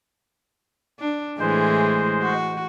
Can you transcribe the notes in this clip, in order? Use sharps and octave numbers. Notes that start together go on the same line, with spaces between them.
D4
A2 E3 G#3 G#4 C5
F#4